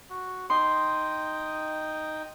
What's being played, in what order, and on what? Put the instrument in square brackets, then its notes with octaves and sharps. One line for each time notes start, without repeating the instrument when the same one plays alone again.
[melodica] F#4
[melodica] D#4 G5 D#6 [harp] C6